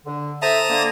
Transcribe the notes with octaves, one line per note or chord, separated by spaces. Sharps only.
D3
A4 C5 E5 A5 A#5 D#6
D3 A#3